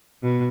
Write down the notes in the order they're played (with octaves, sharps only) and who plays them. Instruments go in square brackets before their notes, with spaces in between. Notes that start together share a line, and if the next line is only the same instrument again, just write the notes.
[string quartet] B2